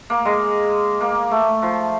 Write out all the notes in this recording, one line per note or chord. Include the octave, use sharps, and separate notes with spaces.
A#3
G#3
A#3
A3
F3